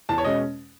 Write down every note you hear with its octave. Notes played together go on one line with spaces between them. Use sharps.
E2 A5
C#5
B2 G#3 C#4 D#5